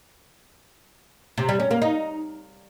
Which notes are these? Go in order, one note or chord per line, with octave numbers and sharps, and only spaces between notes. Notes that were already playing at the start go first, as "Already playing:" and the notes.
C3
G3
C#4
A#3
D#4